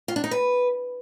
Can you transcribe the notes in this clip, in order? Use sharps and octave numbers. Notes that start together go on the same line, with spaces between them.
F4
D4
D#4
B4